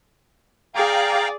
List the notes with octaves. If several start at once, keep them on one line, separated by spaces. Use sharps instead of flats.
G#4 D5 F5 G5 A#5